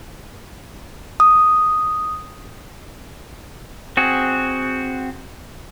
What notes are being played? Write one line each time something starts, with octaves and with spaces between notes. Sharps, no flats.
D#6
C4 F#4 G#4